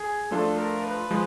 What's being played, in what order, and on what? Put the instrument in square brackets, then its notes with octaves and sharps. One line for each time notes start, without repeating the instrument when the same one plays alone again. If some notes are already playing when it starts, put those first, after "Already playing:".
Already playing: [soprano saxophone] G#4
[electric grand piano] F3 A3 D4 F4 [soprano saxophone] A4
[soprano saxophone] A#4
B4
[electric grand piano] F3 G#3